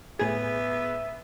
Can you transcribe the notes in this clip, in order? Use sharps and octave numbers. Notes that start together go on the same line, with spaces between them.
A2 B3 G#4 E5